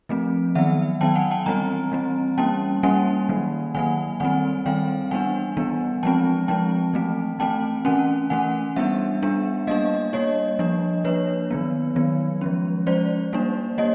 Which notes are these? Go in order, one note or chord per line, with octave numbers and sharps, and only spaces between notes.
F3 A3 C4
D#3 F#3 B3 E5 F#5
D#3 F#3 B3 G5 A5
F#5 G#5
G5 A5
E3 G3 C4 G#5 A#5
E3 G3 C4
G3 A#3 C#4 G5 A5
G3 A#3 C#4 F#5 G#5
D#3 F#3 A#3
D#3 F#3 A#3 F#5 G#5
D#3 G3 C4 F#5 G#5
D#3 G3 C4 F5 G5
E3 G3 B3 D4 F#5 G#5
E3 G3 B3 D4
F3 G#3 C4 G5 A5
F3 G#3 C4 G5 A5
E3 A3 C4
E3 A3 C4 G5 A5
E3 A3 C#4 F#5 G#5
E3 A3 C#4 F#5 G#5
G3 B3 D4 E5 F#5
G3 B3 D4
G3 A#3 D4 D#5 F5
G3 A#3 D4 C#5 D#5
F3 A#3 D4
F3 A#3 D4 B4 C#5
D#3 F#3 B3
D#3 F#3 B3
F3 G#3 C#4
F3 G#3 C#4 C5 D5
G3 A#3 D4
G3 A#3 C#5 D#5